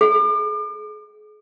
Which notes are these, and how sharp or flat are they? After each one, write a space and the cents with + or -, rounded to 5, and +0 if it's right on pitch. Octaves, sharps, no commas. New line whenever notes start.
G#4 +35